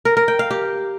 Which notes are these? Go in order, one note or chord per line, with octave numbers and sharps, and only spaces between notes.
A#4
A#4
G5
F5
G4